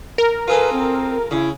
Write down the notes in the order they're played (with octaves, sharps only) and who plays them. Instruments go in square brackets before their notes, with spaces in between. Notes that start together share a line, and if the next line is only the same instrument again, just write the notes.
[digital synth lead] A#4
[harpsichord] F4 G#4 A4 [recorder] B4
[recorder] C4
[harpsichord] C#3 [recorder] E4